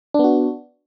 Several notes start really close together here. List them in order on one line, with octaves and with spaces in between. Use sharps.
D4 B3 F#4